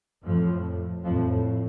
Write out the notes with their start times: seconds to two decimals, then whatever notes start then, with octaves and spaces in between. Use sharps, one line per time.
0.24 F2 A2 F3
1.04 F2 A2 F3